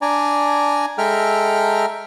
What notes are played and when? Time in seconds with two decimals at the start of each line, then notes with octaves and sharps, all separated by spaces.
0.02 D4 D5 G#5 A#5
0.98 G#3 A4 E5 G5 A#5 F6